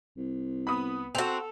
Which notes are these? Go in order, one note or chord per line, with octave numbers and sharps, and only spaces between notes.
C2
B3 B5 D#6
C4 F#4 A4 F7